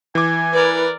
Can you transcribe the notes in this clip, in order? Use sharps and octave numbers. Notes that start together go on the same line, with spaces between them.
E3 G#5 D6
A#4 B4 D5